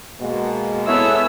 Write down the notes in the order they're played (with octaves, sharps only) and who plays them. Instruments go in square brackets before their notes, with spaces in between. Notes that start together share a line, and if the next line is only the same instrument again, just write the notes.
[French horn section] B2 G#3 A#3
[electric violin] B3 E6 [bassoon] E4 [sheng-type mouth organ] G#4 A4 C#5